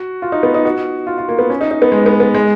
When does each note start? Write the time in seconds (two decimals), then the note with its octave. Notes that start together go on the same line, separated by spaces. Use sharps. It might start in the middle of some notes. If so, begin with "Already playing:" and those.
Already playing: F#4
0.22 F4
0.32 D#4
0.43 B3
0.54 D#4
0.65 F#4
1.07 F4
1.18 F4
1.28 A#3
1.39 B3
1.50 C#4
1.61 D#4
1.71 D#4
1.82 B3
1.92 G#3
2.06 B3
2.20 B3
2.34 G#3